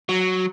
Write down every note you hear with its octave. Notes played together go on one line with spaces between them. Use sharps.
F#3